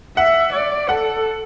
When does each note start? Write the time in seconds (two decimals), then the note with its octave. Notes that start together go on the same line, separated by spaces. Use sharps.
0.17 E5 F#5
0.53 D5
0.89 A4 F#5